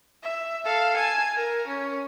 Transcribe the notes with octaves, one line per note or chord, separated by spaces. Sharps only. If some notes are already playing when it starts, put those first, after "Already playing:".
E5
A4 F5
G#5 A5
A#4
C#4